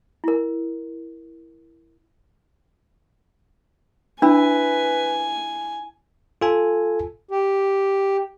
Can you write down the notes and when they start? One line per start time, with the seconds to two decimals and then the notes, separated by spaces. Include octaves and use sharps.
0.24 E4 A#4
4.22 D4 E4 B4 G#5
6.41 F4 A4 G#5
7.31 G4